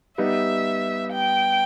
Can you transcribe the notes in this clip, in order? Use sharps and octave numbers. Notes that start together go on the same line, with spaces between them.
G3 B3 D#4 E5
G5